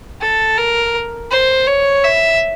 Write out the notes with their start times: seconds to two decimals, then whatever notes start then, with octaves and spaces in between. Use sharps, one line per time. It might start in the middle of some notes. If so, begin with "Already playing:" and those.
0.21 A4
0.57 A#4
1.31 C5
1.67 C#5
2.04 E5